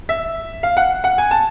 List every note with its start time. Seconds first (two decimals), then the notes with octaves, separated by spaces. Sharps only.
0.09 E5
0.63 F5
0.77 F#5
1.04 F#5
1.18 G#5
1.31 A5